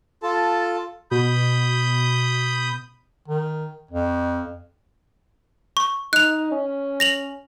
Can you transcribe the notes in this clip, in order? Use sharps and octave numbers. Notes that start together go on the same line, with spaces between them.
F4 A4 A5
B2 B5 D#6 G6
D#3
F2
C#6
D#4 F#6 F7
C#4
A#6 F7 F#7